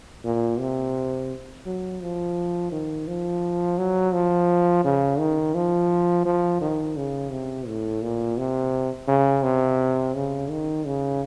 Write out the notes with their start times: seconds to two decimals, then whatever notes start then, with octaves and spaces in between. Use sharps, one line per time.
0.25 A#2
0.60 C3
1.66 F#3
2.02 F3
2.72 D#3
3.08 F3
3.78 F#3
4.13 F3
4.85 C#3
5.19 D#3
5.55 F3
6.26 F3
6.61 D#3
6.97 C#3
7.31 C3
7.67 A2
8.02 A#2
8.38 C3
9.08 C#3
9.43 C3
10.15 C#3
10.50 D#3
10.85 C#3